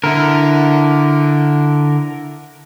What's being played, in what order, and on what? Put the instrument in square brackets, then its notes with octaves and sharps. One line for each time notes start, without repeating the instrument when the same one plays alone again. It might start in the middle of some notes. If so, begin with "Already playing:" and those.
[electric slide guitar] D3 [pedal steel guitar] E4 A#4